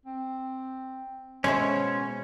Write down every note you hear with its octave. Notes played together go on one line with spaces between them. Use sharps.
C4
B2 G#3 C#4 C5 C#5 E5